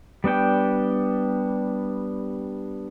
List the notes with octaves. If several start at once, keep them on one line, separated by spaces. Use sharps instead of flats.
G3 B3 D4 G5